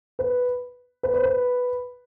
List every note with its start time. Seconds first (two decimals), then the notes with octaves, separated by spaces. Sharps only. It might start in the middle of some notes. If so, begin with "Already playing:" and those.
0.19 B4
1.03 B4
1.14 C5
1.23 B4